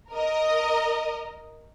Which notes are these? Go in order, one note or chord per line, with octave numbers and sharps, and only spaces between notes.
A#4 D#5